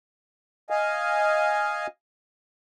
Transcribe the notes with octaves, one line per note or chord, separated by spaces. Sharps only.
D#5 F5 G#5